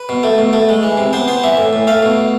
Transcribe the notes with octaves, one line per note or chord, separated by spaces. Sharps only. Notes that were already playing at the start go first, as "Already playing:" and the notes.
Already playing: B4
B2
A3
B2
A3
G#3
E3
C3
B3 C5
B3 C5
E3 E5
A2
A2
A3 F5
B2